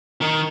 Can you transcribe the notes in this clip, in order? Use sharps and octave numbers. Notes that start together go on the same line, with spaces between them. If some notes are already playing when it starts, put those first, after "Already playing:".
D#3